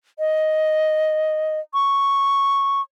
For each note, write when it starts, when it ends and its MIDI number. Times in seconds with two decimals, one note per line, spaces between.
0.19 1.60 75
1.74 2.82 85